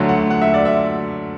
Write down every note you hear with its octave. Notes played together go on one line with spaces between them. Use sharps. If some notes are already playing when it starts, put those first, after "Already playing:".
Already playing: D2 D3 F#3 A3
F#5
F#5
E5
D5
E5